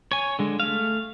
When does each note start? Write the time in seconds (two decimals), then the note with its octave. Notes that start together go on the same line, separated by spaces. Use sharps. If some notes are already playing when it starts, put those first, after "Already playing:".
0.12 C#5 G#5
0.39 D3 G#3
0.60 A3 F5